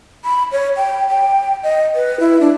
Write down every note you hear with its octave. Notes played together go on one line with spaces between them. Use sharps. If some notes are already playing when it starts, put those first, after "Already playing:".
B5
C#5
G5
G5
D#5
B4
E4
D4